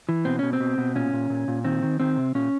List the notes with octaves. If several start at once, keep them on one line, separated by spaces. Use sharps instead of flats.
E3
B2 C4
B2 C#4
C4
B2
B2
A#2 C#4
A#2
A#2
A#2
D#3 C4
D#3
D#3 C4
C3
A#2 C#4